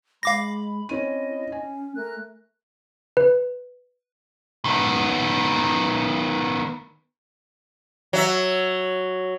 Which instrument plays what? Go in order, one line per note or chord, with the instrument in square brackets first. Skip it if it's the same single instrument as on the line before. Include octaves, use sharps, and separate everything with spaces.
[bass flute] G#3 [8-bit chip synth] F5 D6 A#6 [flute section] B5
[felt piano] C4 C#4 D#7 [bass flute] E4 [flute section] D#5
[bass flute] C#4 [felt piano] G#5
[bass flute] A3 [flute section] A#4 F#6
[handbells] B4
[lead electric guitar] D#3 B3
[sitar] F#3 E5